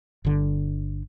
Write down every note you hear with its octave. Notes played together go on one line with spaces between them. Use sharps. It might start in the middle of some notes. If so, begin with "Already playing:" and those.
G1 D3